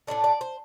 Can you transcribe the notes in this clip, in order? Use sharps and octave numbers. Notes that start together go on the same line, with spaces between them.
A2 A3 D4 D5
D5
C5